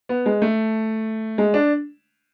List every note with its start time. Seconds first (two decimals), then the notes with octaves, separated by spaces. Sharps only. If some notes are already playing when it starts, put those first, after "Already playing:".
0.09 B3
0.26 G#3
0.42 A3
1.38 G#3
1.54 D4